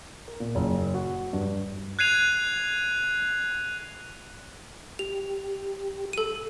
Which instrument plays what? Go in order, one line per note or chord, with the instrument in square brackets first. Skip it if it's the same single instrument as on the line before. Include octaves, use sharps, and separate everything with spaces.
[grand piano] A#4
A#2
F#1
F#4
G2
[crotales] F#6 G#6 C7 D#7 F7
[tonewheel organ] G4 [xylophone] F7
[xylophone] A4 D#7